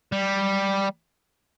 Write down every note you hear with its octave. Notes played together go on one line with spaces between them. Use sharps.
G3